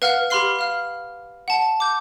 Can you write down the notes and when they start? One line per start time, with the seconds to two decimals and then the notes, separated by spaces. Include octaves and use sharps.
0.02 B4 F5 F#5 F6 F#6
0.30 G4 B4 B5 C6 F6 C7
0.59 F5 F6
1.48 F#5 A5
1.80 D6 G6